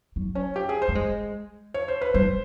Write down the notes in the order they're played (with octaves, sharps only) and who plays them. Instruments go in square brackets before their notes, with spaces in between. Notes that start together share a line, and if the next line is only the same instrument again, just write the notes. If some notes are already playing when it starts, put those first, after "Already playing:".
[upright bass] F#3
[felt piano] C#4
G4
G#4
C5
[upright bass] A3
G#3
[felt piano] C#5
C5
B4
[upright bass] G3 [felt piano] C5